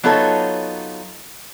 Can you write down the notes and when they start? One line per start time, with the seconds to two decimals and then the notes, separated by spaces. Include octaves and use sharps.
0.03 F#3 B3 D#4 F4 A4 C#5